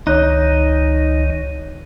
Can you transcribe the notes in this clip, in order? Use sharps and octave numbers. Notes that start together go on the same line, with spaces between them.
C#2 D#3 D#4 C#5 F#6